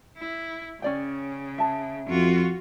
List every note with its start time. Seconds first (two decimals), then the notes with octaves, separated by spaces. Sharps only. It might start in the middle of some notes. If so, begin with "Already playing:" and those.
0.18 E4
0.82 C#3 C#4 D5 G5
1.58 E5 A5
2.09 F2 F4 F#4